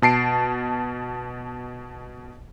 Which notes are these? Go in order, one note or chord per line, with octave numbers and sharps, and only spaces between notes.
B2 A5 C7 D7